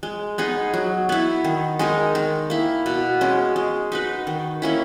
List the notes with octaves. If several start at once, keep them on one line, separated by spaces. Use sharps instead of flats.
G#3
B3 D#4 G#4
F#3
B3 E4
D#3
G#3 D#4 A#4
D#3
A#3 E4
B2
G#3 C#4
G#3
D#4 F#4 B4
D#3
A#3 C#4 E4